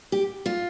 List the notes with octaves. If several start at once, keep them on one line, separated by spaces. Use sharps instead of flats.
G4
F4